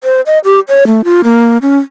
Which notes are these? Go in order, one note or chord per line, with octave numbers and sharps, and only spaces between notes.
C5
D#5
G4
C#5
A3
F4
A#3
C#4